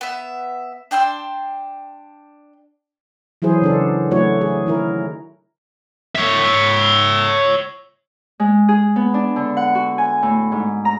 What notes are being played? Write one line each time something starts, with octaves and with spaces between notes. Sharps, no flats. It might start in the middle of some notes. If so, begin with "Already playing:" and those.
B3 E5
D4 G5 C6 E6
E3 F#3 E4 G#4 C5
C#3 D4 A4
F#3 A3 E4 F#4 C#5
G#4
D#3 E4 A#4
C#5 E5
G#3
G#4
B3
D4
D3
F#5
F#4
G#5
A2
G#2
A#5